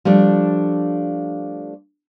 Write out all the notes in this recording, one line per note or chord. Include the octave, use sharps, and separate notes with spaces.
F3 G3 A3 D4